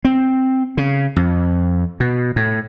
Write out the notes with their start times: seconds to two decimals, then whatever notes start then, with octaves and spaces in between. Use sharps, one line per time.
0.05 C4
0.77 C#3
1.16 F2
2.00 B2
2.36 A2